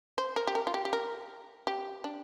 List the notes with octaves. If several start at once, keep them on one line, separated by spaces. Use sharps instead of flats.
C5
A#4
G4
A#4
F4
G4
G4
A#4
G4
D4